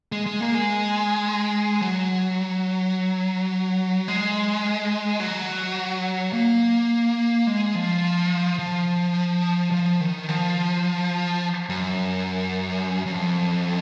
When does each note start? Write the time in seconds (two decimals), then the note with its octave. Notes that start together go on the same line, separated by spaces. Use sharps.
0.12 G#3
0.26 G#3
0.41 A#3
0.54 G#3
1.82 F#3
4.08 G#3
5.20 F#3
6.33 A#3
7.47 G#3
7.75 F3
8.59 F3
9.72 F3
10.01 D#3
10.29 F3
11.69 F#2
13.06 F#2
13.12 F2